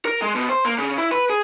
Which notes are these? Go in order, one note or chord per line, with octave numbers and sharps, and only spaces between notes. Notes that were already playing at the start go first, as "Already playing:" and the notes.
A#4
G#3
B2
C5
A#3
C#3
E4
B4
G#4